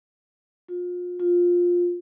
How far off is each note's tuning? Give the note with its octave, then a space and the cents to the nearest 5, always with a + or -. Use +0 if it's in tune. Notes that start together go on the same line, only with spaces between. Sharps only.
F4 +35
F4 +15